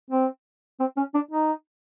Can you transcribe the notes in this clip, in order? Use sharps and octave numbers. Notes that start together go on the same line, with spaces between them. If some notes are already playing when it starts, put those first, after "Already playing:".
C4
C4
C#4
D4
D#4